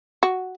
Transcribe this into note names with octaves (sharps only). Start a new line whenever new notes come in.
F#4